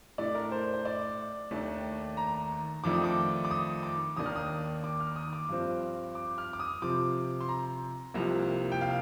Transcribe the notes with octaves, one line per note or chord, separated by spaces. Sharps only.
A2 A3 D4 D5
A#4
C5
C5
D5
D#2 D#3 A3 D4
A#5
F2 D#3 A3 D4 D6
D#6
D6
D6
D#6
D6
D#2 D#3 A#3 D4 D#6
F6
D#6
D6
F6
D#6
D6
G2 F3 C4
D6
F6
D6
D#6
C3 F3 C4 D6
C6
A#5
C2 C3 F3 A#3
G5
F5